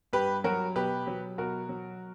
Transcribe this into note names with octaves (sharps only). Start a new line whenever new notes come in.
G2 G4 B4
F#3 F#4 A#4
B2 G4 B4
F#3
B2 F#4 A#4
F#3